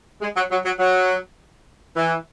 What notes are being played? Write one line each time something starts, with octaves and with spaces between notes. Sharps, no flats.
G#3
F#3
F#3
F#3
F#3
E3